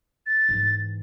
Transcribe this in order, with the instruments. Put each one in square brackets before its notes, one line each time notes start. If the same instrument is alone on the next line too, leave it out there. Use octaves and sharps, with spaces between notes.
[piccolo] A6
[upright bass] G#2 E3